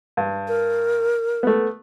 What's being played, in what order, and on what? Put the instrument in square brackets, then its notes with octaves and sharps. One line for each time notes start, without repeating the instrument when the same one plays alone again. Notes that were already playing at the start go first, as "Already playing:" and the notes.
[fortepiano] G2
[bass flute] A#4
[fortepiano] A3 B3